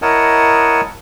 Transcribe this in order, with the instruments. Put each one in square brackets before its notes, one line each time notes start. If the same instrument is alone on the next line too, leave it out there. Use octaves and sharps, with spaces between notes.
[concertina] E4 A#4 C#5 D#5 F#5 A5